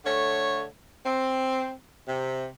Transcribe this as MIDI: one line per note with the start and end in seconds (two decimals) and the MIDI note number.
0.05 0.65 50
0.05 0.65 57
0.05 0.65 73
1.05 1.72 60
2.07 2.47 48